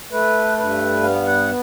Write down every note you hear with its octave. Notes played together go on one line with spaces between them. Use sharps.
A3 B4
G2 B4
B3 F5
F#5